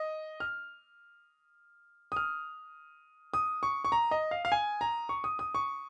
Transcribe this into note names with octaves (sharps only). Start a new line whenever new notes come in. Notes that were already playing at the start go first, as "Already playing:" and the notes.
Already playing: D#5
F6
D#6
F6
D#6
C#6
C#6
A#5
D#5
F5
F5
G#5
A#5
C#6
D#6
D#6
C#6